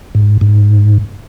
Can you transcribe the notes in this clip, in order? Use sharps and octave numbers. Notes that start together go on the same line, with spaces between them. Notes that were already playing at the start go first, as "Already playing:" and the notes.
G#2
G#2